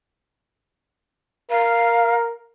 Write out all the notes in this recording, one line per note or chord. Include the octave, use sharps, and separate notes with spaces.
A#4 F5